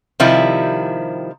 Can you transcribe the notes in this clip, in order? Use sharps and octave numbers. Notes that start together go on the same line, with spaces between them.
C3 D#3 F3 G3 E4